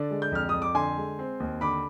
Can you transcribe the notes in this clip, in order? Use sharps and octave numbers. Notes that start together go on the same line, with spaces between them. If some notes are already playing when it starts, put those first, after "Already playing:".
Already playing: D3 D5
G#3
G6
F2 F6
F2 D#6
D6
D3 G#5 C6
G#3
C4
D#2
D3 B5 D6